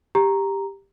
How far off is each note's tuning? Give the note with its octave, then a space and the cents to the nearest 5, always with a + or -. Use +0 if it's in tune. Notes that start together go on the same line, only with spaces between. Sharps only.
G4 +10 A#5 +0